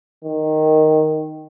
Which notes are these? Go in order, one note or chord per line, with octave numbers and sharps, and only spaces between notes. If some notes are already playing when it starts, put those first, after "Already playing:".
D#3